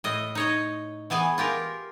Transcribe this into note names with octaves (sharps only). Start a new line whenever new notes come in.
A2 D#5
D#4 C#5 D#5
E3 B3 G#4 G#5
F4 G4 A#4